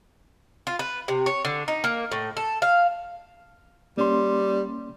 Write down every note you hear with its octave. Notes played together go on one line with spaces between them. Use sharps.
F4
B4
C3
C#5
D3
D#4
A#3
A2
A4
F5
G3 A#3 C#4 C6